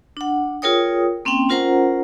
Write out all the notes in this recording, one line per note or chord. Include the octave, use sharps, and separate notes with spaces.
D4 F#5
F4 G#4 A#4 C#5 G5 D#6
A#3 C4 C#4 G5
C#4 F4 A#4 C5 F#5 A#5